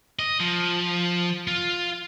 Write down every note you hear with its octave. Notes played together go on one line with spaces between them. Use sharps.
D#5
F3
F4